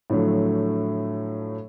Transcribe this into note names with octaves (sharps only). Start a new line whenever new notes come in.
A2 D3 F3 F#3 A3